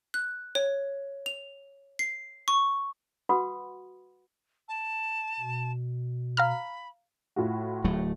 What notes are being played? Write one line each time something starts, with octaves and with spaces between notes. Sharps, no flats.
F#6
C#5
F7
C7
C#6
F#4 B4 F#5 B5 C6 D#6
A5
B2
F5 A#5 B5 F6
A2 F4 F#4
D1 F#3 A3